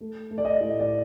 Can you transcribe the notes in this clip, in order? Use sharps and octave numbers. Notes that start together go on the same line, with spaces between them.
A3
A3
D5
D#5
A2
D5